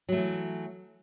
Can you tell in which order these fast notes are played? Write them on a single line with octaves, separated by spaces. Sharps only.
F#3 A3 E3